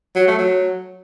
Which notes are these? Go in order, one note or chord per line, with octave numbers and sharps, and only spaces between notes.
F#3
A3
F#3